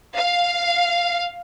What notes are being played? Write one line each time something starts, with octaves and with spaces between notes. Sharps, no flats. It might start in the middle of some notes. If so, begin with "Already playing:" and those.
F5